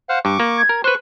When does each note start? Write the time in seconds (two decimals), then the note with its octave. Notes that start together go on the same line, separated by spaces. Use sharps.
0.09 C5 F5 F#5
0.25 G2 C#6 D6
0.40 A#3
0.57 G#6
0.69 A#4
0.84 B4 C5 C#6 F#6